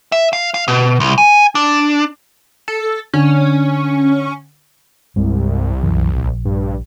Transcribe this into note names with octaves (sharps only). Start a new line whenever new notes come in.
E5
F5
F5
B2
C2
G#5
D4
A4
D3 C#4
C2 G2 G#3
B1 F#2 E3
A#1
G2